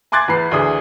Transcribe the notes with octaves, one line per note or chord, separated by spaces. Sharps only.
G#5 C6 D6 F#6 G#6 A6
E2 E3 B3 B5 C7
D2 E3 D4 G#4 D#6